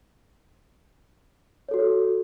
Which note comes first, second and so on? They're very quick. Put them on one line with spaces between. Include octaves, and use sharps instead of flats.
C#5 A4 F#4